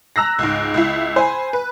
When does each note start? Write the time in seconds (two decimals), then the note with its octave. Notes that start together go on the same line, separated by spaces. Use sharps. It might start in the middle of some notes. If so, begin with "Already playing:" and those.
0.16 A#5 E6 F#6 A#6
0.39 C#2 G#2
0.74 C#2 E4
1.16 C5 G#5 B5
1.53 B4